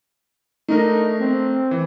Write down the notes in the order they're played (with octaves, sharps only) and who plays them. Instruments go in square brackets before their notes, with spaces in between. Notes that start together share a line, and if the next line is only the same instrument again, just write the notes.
[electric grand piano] A3 D4 A#4 [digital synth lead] D#4
[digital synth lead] C4
[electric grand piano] E3